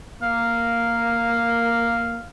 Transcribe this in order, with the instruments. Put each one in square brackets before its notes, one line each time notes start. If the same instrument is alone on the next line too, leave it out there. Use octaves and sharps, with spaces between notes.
[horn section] A#3 [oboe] F5